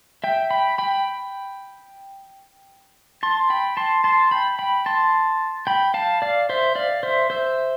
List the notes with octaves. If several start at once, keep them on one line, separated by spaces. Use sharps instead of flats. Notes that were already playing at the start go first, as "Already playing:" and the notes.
E5 G5
G5 B5
G5 B5
A5 C6
G5 B5
A5 C6
A5 C6
G5 B5
G5 B5
A5 C6
G5 B5
F5 A5
D5 F5
C5 E5
D5 F5
C5 E5
C5 E5